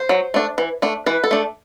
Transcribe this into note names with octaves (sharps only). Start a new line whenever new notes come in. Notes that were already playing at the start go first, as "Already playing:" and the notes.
Already playing: C5
F#3
A3 D4
E3
A3 D4
E3 B4
A4
A3 D4